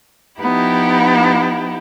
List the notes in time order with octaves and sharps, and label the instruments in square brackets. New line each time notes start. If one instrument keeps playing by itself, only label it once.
[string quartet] F3 B3 D#4 E4 G4